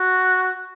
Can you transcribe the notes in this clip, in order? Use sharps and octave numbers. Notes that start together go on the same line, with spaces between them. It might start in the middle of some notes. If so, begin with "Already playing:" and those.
Already playing: F#4